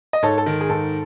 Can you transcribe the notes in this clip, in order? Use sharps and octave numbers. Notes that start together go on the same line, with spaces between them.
D#5
G#2 A4 C#5
A4
D#3
G#4
G#2 A4